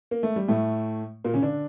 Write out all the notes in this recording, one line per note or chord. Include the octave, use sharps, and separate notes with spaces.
A#3
A3
G3
A2 A3
A#2 A#3
C#3 C#4
D3 D4